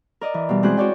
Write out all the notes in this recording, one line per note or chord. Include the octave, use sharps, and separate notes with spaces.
A#4 D5 D#5
E3
B2 G3
G#3 C4 E4 F#4 G#4 F#6
F#4 C#5 D5 G5